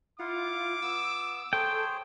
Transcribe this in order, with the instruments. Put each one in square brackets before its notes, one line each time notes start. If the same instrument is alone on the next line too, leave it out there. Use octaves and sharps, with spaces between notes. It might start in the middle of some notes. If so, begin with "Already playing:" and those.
[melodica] E4 F5 F#5 [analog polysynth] F4 [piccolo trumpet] D6
[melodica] B3 [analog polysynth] E6
[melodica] G#4 C5 C#5 [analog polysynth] A4 [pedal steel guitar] G5